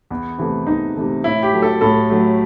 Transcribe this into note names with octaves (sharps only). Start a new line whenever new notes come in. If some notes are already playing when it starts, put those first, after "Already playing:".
E2
C3 E3 A3
E2 D#4
C3 E3 A3
A2 E4
G4
F#3 A3
A4
A2 A4
F#3 A3